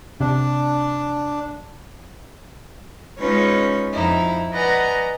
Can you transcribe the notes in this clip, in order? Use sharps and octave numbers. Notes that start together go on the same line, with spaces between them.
C3 D4
G#3 C#4 D#4 F4 B4 C#5
F2 D#4 E4
B4 D5 D#5 F#5 G#5 A#5